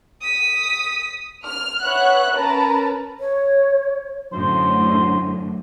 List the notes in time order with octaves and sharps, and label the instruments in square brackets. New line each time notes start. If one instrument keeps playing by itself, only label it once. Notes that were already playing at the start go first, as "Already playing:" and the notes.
[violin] D#6 B6
[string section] F6
B4 C#5 E5 F#5 F#6
C#4 A#4 B4 A5 A#5
[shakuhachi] C#5
[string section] F#2 A2 D3 [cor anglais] C5